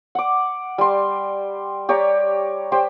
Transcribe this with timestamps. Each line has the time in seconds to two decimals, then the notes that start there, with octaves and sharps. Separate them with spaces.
0.15 F#5 D6
0.78 G3 C6
1.89 G4 C#5 D5 A#5
2.72 G4 C5 G5